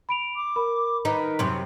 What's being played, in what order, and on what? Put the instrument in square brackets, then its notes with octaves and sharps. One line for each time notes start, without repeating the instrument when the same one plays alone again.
[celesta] B5 D7 F7
[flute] D6
[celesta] A#4 B5
[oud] D#3 D#4 [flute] B4
[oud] F#2 C3 [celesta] C6